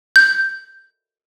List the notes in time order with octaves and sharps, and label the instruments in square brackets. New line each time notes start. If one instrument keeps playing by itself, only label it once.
[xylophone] G6